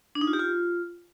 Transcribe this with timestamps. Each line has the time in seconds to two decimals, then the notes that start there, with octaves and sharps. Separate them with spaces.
0.15 D4
0.21 D#4
0.27 F4
0.33 G4
0.39 F4